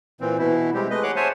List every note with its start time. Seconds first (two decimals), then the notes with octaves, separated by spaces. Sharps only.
0.21 A#2 E3 C4
0.38 B2 E3 E4
0.74 G3 G#3 C4 G4
0.90 G#3 A3 B4 D#5
1.03 G#4 C#5 F#5 D6 F#6
1.16 C5 C#5 E5 F#5 G#5 A5